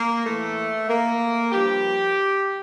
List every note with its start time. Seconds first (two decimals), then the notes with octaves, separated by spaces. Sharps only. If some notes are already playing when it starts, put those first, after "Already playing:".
Already playing: A#3
0.24 A2 E3 A3
0.88 A#3
1.52 G2 F3 G4